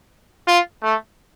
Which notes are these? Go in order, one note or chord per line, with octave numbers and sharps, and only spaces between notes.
F4
A3